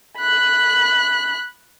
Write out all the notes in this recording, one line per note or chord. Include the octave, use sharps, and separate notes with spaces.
B5 F#6